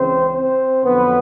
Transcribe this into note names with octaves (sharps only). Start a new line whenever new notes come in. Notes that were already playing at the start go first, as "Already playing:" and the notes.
Already playing: C#2 C#3 E3 C4 C5
C4 C5
F2 D3 F#3 B3 B4